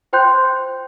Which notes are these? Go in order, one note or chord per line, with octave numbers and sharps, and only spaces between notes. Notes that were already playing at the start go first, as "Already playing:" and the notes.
F4 C5 G5 C6 F#6 G6